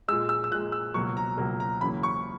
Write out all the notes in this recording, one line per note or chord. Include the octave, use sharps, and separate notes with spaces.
A#2 G#3 E6
E6
E6
A#2 G#3 F#6
E6
C#2 B2 F#3 A#3 C#6
A#5
C#2 B2 F#3 A#3 A#5
A#5
E2 C#3 F#3 A#3 B5
C#6